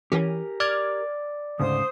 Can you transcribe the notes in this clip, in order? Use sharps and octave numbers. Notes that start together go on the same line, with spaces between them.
E3 C#4 G4 A#4 G#5
D5 D6 F6 G#6
D2 G#2 C#3 C5 D#6